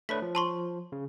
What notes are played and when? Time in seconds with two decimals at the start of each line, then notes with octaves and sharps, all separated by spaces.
0.09 A3 D4 B4 C#5 B6
0.22 F3
0.35 A5 C6 C#6
0.92 C#3